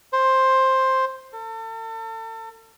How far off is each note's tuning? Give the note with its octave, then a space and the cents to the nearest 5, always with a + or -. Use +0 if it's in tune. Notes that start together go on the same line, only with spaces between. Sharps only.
C5 +10
A4 +35